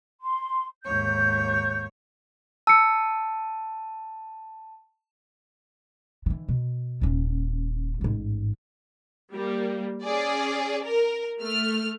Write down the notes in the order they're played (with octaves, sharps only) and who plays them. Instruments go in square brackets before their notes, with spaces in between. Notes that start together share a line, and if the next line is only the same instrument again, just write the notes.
[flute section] C6
[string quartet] D#2 G#2 C#5 [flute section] G6
[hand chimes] A5 [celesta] E6 C#7
[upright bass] D#3 E3
B2
D#1 C#4
A1 G#2
[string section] G3 A#3
C#4 G#4 D5
A#4
A3 F6